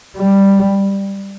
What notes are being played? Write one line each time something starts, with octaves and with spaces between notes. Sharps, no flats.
G3